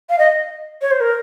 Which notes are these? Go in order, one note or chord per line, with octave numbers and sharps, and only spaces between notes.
F5
D#5
C#5
C5
A#4